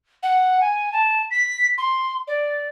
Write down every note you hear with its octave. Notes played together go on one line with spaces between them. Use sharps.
F#5
G#5
A5
B6
C6
D5